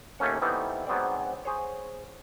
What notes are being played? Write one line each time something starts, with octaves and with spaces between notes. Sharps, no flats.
D#2 A3 A#3 C#4 F#5
E3 G3 A3 B3 C4 D#4
G#2 F#3 B3 C4 D5
G#4 C5 C#5